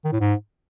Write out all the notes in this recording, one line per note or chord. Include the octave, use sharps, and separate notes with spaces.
D#3
A2
G#2